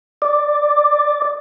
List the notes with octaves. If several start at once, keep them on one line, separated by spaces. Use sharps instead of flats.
D5